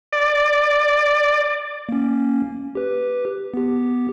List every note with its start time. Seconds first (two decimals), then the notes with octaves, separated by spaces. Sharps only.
0.13 D5
1.89 A#3 C#4
2.75 G4 B4
3.54 B3 G4